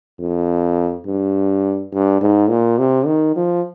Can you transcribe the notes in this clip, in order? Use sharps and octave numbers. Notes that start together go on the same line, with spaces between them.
F2
G2
G2
G#2
A#2
C3
D#3
F3